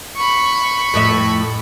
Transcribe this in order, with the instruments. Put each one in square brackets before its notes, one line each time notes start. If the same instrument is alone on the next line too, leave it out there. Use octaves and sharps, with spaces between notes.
[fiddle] B5 C#6
[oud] F2 A2 E5